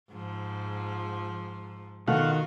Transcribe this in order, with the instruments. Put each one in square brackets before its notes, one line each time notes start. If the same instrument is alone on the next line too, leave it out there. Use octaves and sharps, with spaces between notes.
[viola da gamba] G#2 F3
[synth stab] B2 A3 [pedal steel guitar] D#3 [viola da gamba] F4 F#4 [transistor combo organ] F5 F#5